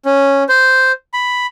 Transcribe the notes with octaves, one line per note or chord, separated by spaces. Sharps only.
C#4
C5
B5